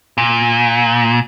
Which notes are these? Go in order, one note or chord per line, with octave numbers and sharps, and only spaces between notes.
A#2